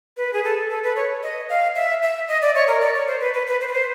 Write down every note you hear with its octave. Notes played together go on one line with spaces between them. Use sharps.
B4
G#4
A4
A4
B4
C#5
D#5
F5
E5
E5
D#5
D5
C#5
A#4
D5
C#5
C5
B4
B4
B4
C5
B4
C5